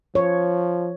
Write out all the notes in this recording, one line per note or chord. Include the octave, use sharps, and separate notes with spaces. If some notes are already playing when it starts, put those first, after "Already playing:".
F3 C#5